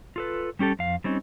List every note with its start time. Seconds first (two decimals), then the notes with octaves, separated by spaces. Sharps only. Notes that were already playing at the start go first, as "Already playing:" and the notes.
0.16 F4 A4 B4
0.59 G3 C#4 G4 A4
0.79 F2 F5
1.04 G3 C4 C#4 D#4